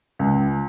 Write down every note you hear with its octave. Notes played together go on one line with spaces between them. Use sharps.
C#2